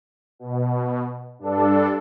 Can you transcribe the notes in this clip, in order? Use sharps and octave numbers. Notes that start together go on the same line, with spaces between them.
B2
G2 D4 A4